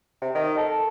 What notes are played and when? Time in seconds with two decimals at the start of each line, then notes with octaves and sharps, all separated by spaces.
0.21 C3
0.35 D#3
0.57 A4